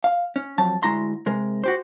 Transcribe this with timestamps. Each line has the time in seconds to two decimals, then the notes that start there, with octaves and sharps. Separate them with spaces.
0.04 F5
0.36 C#4
0.58 F2 F#3 A5
0.83 D2 G#3 E4 A#5 C6
1.26 C3 G#3 A#4
1.64 F#4 G4 C5